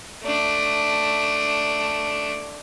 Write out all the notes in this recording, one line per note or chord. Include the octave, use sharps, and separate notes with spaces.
A3 D4